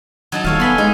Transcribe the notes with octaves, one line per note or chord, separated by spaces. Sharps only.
F#3 D#4 A5
D#1 A4 C#5 F5
B3 G#5 B5 C6
G#3 D#4